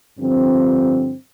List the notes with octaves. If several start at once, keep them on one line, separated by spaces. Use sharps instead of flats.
G2 D3 F3 C4